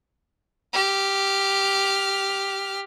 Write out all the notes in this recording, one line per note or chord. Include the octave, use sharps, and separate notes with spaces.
G4 F6